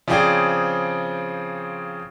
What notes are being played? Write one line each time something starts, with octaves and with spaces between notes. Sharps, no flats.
C#3 F3 C4 G#4 D5 G5